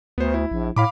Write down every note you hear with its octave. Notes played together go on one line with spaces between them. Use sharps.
D2 B3 C5
E4
A#1
A2 F5 B5 D6